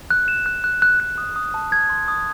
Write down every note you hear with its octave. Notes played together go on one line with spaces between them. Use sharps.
F#6
E7
F#6
F#6
F#6
F#6
D#6
D#6
A5
G#6
C6
D#6